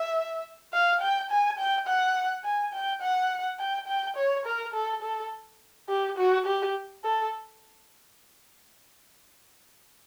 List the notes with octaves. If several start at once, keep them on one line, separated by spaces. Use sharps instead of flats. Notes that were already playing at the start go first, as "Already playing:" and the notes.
Already playing: E5
F5
G5
G#5
G5
F#5
G#5
G5
F#5
G5
G5
C#5
A#4
A4
A4
G4
F#4
G4
A4